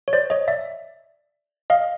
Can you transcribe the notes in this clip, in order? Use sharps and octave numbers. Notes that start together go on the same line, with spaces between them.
C#5
C5 D5
C#5 D#5
D5 E5
D#5 F5